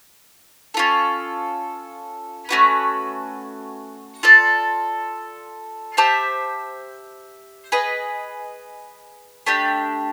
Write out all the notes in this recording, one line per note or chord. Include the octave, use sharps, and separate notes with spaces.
C#4 F4 A4
A3 C#4 F#4 B4
F4 A4 D5
G4 C5 E5 A5
G#4 B4 D#5
A3 D4 G4